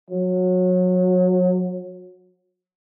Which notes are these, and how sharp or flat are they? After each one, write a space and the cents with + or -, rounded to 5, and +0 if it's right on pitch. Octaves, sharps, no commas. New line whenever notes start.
F#3 -25